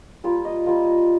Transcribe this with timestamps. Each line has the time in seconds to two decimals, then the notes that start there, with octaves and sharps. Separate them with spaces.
0.24 G3 A#3 F4
0.45 D#5
0.66 G3 A#3 F4